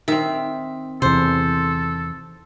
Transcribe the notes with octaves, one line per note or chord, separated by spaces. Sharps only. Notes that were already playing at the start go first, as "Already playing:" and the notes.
D#3 C4 E5
E2 C3 A4 C5